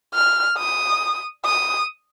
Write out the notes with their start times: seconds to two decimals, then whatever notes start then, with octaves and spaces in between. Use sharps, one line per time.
0.14 F6
0.58 D#6
1.45 D#6